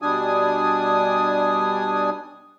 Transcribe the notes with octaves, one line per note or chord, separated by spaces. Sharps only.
B2 G3 D4 G#5 D#6